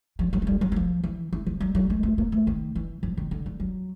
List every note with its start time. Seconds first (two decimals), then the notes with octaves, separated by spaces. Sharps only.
0.19 F3
0.33 F#3
0.42 G#3
0.47 G3
0.61 F#3
0.72 F#3
0.76 F3
1.04 E3
1.33 E3
1.47 F3
1.60 F#3
1.75 F#3
1.90 G#3
2.03 A3
2.18 A#3
2.32 A3
2.47 D#3
2.75 E3
3.03 F3
3.17 D#3
3.31 D3
3.46 F3
3.60 F#3